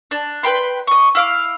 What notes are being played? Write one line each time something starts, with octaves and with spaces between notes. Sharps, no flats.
D4
B4 G5 B5 C6
D#5 C#6
E4 F5 D6